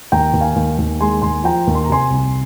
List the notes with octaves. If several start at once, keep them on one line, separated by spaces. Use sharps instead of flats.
D#2 G5 A#5
D#2
F5 G#5
D#2
D#2
G#3 G#5 C6
D#2 G#5 C6
F3 G5 A#5
D#2
C6
A#5
C3 G#5 C6
C2